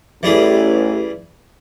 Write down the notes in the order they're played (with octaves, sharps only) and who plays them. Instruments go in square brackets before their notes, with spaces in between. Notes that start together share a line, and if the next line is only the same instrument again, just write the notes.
[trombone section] A1 [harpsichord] E3 G3 G#4